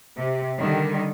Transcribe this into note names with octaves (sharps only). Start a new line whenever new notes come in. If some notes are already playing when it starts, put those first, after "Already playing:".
C3
D3 D#3 G3